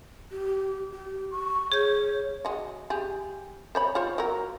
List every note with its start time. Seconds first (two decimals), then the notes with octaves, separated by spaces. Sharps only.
0.31 G4
0.92 G4
1.31 C#6
1.72 G#4 C#5 G6
2.45 G#3 F#4
2.90 G4 G#4
3.75 C5 C#5 B5
3.95 F4 C5 C#5
4.18 F#3 A#4